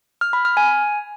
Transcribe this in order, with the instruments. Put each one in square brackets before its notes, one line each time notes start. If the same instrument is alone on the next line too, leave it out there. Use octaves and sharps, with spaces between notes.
[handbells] F6
B5
F6
G#5